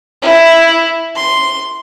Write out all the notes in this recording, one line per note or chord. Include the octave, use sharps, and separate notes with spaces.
E4
C6